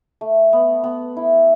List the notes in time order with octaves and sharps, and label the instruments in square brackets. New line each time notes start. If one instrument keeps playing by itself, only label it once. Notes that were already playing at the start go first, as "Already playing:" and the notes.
[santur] A3
B3
B3
E4